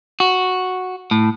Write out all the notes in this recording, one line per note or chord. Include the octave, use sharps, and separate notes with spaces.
F#4
A2